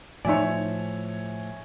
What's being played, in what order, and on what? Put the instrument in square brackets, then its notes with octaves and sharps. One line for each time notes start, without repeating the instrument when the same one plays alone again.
[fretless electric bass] A2 F3 [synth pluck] D#4 D5 [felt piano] C#5 E5 G#5